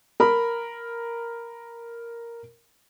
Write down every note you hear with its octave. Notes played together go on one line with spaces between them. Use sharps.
A#4 B5